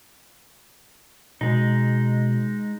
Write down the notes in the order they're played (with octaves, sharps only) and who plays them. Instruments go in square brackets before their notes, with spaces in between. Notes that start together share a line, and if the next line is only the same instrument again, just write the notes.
[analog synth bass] B2 [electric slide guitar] G#3 D#4